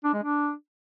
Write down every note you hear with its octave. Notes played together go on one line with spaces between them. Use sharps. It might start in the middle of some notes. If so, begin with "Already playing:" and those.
D4
G#3
D4